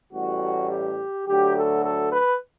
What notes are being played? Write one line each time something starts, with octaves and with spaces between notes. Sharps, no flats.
A1 A2 G3 F#4
G4
D2 D3 F#3 G4
A4
A4
B4